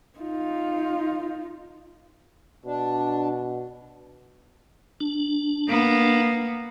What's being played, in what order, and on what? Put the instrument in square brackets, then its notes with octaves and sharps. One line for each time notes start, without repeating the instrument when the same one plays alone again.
[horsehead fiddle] D#4 F4
[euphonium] B2 [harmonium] D4
[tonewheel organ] D4
[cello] A#3 B3